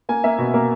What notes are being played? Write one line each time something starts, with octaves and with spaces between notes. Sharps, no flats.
A#3 G#5
A#3 E5
B2
A#3